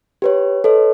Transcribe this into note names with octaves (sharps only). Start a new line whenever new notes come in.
G4 B4 C#5
A4 B4 C#5 D#5